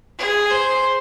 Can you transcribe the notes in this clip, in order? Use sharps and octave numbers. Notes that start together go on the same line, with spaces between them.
G#4
C5